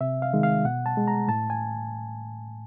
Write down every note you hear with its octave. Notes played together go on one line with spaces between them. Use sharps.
C3 E5
F5
D#3 G#3
F5
B2 F#5
A5
G#3
A#5
A2 A5
G#5